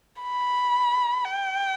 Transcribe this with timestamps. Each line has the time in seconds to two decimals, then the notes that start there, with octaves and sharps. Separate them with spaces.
0.22 B5
1.25 G5